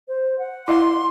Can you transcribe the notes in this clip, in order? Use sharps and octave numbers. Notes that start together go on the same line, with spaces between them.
C5
F#5
E4 D#5 F5 C6